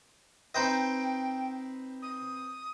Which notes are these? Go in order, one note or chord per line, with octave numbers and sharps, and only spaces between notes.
C4 D#4 B4 C5 D#5 G5
D#6